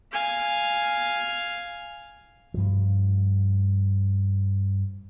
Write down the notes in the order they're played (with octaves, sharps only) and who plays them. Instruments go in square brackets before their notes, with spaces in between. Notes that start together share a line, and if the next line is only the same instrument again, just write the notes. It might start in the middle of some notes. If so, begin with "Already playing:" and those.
[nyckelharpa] F5 G#5
[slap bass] G2 F3